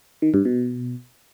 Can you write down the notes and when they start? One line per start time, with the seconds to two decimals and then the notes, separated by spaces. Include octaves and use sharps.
0.22 D#3
0.34 G2
0.45 B2